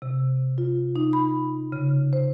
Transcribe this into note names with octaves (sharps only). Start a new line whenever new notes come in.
C3
F4
D#4
B5
C#3
C5